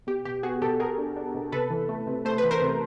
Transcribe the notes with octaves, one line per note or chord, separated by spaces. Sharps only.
B2 G4
B2 G4
B3 F#4 G#4
B2 G4 A4
B2 G#4 A#4
D4
D4
B2
C3 A4 B4
E3
A3
C3
A3 C5
B4
E3
A#4 C5
C3